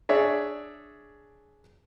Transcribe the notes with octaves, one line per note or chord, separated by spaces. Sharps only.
D4 G#4 C#5 D5 E5